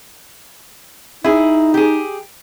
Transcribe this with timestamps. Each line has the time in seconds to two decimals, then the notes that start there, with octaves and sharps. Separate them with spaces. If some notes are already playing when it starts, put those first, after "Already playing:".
1.24 D#4 E4 G#4
1.74 G4 G#4